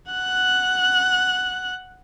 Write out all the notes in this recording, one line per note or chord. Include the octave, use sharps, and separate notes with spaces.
F#5 F#6